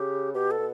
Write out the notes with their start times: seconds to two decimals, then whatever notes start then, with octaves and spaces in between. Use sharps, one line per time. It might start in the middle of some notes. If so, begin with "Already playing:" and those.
Already playing: C#3 G4
0.34 B2 G4
0.51 A4
0.59 B2